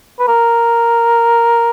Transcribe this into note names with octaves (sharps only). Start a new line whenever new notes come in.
B4
A#4